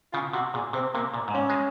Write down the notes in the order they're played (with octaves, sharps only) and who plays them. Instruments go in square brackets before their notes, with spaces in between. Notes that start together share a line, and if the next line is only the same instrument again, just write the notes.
[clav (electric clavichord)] C#3 [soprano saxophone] F4
[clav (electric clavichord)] C3 [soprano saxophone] F#4
[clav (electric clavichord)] A#2 [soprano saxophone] G#4
[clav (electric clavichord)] C3 [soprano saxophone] C4
[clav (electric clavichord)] C3 [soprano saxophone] A#3
[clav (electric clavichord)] A#2
G#2
[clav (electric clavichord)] A#2 [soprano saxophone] C#4
[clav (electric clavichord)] G#3